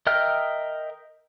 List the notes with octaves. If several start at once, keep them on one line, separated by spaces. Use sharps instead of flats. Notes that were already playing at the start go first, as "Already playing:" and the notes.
A#4 D#5 E5 G5 F6